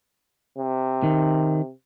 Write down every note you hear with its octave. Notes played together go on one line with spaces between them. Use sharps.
C3
D#3